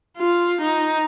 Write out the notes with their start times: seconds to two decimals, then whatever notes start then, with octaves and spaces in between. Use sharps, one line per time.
0.17 F4
0.62 D#4